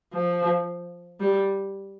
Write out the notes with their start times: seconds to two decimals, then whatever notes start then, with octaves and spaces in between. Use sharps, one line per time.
0.14 F3
1.20 G3